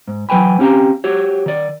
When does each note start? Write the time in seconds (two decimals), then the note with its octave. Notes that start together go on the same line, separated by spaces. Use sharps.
0.08 G#2
0.29 E3 F#3 B4 G5 G#5 B5
0.59 C4 C#4 G4 F5 A#5
1.04 F#4 G4 C#5
1.46 D#3 D5